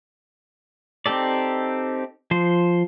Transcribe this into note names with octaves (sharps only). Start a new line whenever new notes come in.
C4 D#4 G4 A4 D5
F3 C5